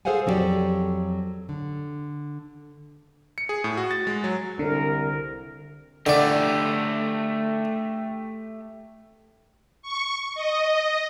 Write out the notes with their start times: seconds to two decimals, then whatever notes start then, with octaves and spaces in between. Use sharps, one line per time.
0.05 G#4 A4 C5 F5 F#5 G#5
0.26 F2 F#3 C#4 G4 A4 D5
1.49 D3
3.38 C#7
3.49 G#4
3.64 A2
3.77 F#4
3.91 A6
4.07 G#3
4.24 F#3
4.59 C2 D3 A#4
6.06 D3 A3 G4 D5
9.82 C#6
10.35 D#5